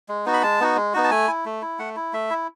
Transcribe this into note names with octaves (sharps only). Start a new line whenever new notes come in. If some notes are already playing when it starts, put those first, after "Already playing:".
G#3
B3 D#4 F#4
B5
G#3 A5
B3 D#4 F#4
G#3
B3 D#4 F#4
A5
A3 G#5
E4
A3
E4
A3 F#5
E4
A3 E5
E4